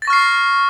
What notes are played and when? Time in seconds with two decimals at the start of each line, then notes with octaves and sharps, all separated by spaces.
0.02 A6
0.05 A#6
0.07 C#6
0.10 F6
0.13 C7